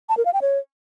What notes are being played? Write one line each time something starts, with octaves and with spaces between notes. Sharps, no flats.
A5
A#4
F5
G5
C#5